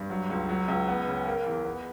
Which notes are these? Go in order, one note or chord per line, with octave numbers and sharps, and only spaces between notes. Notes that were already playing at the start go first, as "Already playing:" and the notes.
Already playing: G2
F#3
C#2
F#3
C#2
B3
C#3
A#3
E2
B3